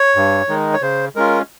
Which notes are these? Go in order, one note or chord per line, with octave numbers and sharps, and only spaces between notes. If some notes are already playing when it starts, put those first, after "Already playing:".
Already playing: C#5
G2
D#3 G#3 D#4
C#5
C#3 C5
G#3 C#4 F4 A#4